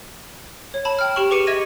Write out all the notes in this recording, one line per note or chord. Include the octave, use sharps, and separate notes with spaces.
C#5
C#5 A5 B5
G5 F6
G4 G5 C#6 F#7
G4 G#4 B4 D6 C#7 D#7
D#5 E5 G#6 A#6 D#7